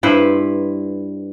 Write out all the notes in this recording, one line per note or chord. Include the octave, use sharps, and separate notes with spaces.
G2 E4 B4 C5